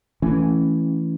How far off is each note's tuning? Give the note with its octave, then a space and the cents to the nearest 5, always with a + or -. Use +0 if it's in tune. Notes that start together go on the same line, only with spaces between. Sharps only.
E3 +0 A3 +0 C#4 +0